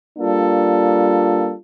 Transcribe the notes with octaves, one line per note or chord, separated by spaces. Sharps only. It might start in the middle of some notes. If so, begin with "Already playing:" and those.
G3 A#3 D4 F4 A4